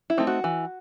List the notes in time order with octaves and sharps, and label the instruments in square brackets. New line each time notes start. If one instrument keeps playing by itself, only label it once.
[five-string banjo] E4
A3 C4 D#4
F#4
E3